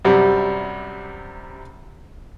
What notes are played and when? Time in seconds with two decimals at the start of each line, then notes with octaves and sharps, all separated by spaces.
0.05 F#2 C3 G3